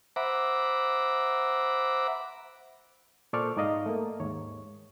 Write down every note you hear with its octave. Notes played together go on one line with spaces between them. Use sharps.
C5 E5 F#5 A#5 B5 D6
A#2 A4 C5 D5 C#6 F6
G#2 D#4 D5 D#5 F5
A3 A#3
D#2 G#2 C#5